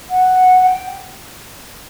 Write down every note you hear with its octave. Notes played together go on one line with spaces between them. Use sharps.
F#5
G5